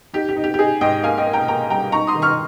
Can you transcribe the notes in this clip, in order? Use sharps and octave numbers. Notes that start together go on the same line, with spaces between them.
D#4 G4
G4
D#4
G4
G4
D#4 G#4
G#2 D#5 G5
A#3 F5 G#5
D#5 G5
A#3
G5 A#5
A#3 G5 A#5
G3 G5 A#5
D#4 A#5 C#6
C6 D#6
D#3
C#6 F6